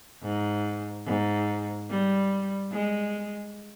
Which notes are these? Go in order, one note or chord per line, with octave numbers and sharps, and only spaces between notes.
G#2
G#2
G3
G#3